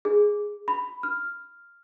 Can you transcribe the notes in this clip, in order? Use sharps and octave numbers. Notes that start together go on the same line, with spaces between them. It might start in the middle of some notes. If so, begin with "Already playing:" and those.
G#4
B5
F6